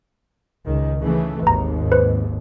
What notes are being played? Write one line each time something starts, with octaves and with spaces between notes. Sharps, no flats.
C#2 D#3
C#3 E3 A3
G#1 D#2 B4 A#5
B4 C5